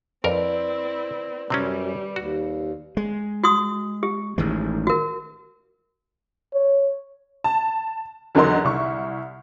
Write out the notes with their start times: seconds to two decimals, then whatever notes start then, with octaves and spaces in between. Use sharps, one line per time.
0.24 F2 C4 E4 A#4 B4 D5
1.50 F#2 C3 G3 C4 C#4
2.16 D#2 F#4
2.97 G#3
3.44 F#4 C6 D#6
4.03 G4
4.38 A1 D#3 G#3
4.87 F#4 A#4
6.54 C#5
7.44 A5
8.35 E2 D3 F#3 D#4 A#4 C6
8.64 C2 E4 C#6